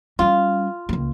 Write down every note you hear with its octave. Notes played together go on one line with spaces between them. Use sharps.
G3 C#4 F4
C#2 A#3